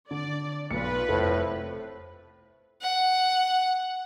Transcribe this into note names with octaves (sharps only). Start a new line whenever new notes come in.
D3 D5
B1 F4 B4 C#7
F1 A2 A4 C5
F#5